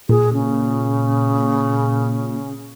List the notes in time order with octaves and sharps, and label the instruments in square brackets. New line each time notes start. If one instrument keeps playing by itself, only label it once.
[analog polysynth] A#2 [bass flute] G#4
[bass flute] C#3